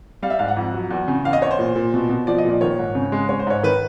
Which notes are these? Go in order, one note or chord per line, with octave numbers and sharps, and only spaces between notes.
G3 F5
E5
G#2 F5
F#5
F2
F#3
E2
C#3
E2 F5
D#5
E2 C#5
C5
A#2
A#2
B2
B2
F3 D5
D#5
A#2 D5
D#3 C#5
G#2
C#3
G#3
G#3 C#5
C5
G#2 C#5
D#3 B4